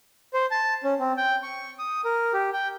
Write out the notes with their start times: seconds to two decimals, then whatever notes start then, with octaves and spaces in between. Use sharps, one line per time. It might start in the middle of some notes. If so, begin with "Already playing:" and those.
0.34 C5
0.51 A5
0.84 C#4
1.00 C4
1.17 G5
1.43 C#6
1.79 D#6
2.05 A#4
2.34 G4
2.53 G5